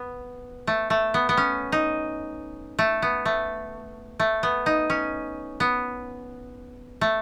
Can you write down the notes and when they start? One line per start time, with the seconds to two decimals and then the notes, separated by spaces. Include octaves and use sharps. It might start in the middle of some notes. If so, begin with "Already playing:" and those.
Already playing: B3
0.67 A3
0.90 A3
1.14 B3
1.29 B3
1.37 C#4
1.72 D#4
2.79 A3
3.02 B3
3.25 A3
4.19 A3
4.43 B3
4.66 D#4
4.90 C#4
5.60 B3
7.01 A3